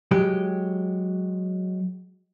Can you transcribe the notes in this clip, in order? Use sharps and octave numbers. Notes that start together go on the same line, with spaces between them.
F#3 G#3 G4